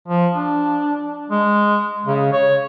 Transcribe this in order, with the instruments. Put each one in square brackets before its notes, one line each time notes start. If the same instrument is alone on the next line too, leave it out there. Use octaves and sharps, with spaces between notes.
[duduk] F3
D4
G#3
C#3
C#5